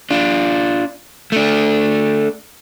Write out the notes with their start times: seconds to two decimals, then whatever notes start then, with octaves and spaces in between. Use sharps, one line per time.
0.11 D4 F4
1.32 A3 D4